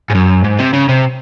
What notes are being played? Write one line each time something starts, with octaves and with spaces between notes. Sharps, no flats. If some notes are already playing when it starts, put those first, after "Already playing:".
G#2
F#2
G#2
C3
C#3
C3